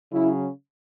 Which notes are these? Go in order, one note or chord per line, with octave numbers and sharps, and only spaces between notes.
C#3 F#3 C#4 E4